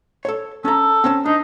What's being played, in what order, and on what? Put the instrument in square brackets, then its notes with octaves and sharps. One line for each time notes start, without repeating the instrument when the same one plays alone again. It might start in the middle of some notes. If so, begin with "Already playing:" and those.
[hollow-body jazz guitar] A4 C#5
[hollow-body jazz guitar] C#4 A#5 [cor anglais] A4
[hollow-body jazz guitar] C4 C#4 A5
[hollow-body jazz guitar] D4 [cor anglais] D#4